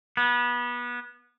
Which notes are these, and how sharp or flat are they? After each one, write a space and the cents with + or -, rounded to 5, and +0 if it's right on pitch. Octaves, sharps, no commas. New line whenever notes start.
B3 -25